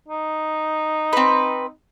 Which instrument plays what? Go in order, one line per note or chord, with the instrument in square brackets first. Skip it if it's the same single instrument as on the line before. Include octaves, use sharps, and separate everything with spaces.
[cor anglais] D#4
[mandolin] C4 B4